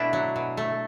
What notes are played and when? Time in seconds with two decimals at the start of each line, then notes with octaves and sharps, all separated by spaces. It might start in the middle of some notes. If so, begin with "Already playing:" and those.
Already playing: B2 A3 D4 E4
0.13 F#3
0.36 B2
0.57 A3